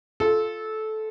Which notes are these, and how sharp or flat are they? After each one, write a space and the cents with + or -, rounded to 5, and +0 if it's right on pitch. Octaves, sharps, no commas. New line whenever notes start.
F4 +0 A4 -15